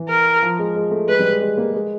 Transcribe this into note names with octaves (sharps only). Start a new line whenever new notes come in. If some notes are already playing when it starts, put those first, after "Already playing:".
Already playing: E3
A#4
F3
G#3
G#3
A3
G#3 B4
G3
G#3
G#3
A#3
G#3